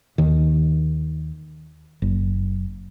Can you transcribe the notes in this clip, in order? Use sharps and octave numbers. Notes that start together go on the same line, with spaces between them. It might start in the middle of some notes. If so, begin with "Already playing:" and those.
D#2 D#3
F#1